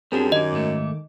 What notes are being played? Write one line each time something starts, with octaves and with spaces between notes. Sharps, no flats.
F#2 G3 C4 D4 G#4 A5
D#3 D#5 D6
G#2 A3